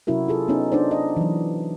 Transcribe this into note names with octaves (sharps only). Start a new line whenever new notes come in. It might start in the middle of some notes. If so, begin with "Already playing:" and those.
C3 F#3 C#4 E4 F#4 A#4
F4 G#4 A4
B3 C#4 D#4
D4 D#4 C5 D5
D#5
E3 F#3